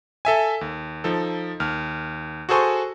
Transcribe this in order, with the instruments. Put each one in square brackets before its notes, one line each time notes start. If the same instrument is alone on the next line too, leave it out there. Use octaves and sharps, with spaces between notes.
[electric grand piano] A4 E5 G#5
D#2
F3 D#4 A4
D#2 F6
F#4 G#4 A4 C5 G#5 C#6